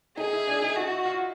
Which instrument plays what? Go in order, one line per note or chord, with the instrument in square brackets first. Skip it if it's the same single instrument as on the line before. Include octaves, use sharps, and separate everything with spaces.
[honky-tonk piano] D#4 [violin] G#4
[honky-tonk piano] E4
D4
D#4
[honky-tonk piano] D#4 [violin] F#4
[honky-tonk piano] E4
F4